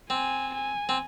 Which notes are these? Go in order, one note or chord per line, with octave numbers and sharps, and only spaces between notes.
C4 G#5
G#5
C4